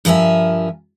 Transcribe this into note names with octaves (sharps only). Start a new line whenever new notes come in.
G2 F3 A#4 E5 G#5